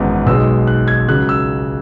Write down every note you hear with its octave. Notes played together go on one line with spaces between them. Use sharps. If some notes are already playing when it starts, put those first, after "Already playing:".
Already playing: G#1 F#2 E3 G#3 B3
B1 B2 G#3 E6
F#6
G#6
C#2 C#3 F#3 F#6
E6